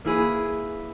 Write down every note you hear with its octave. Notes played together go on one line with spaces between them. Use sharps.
A#3 E4 G#4 B4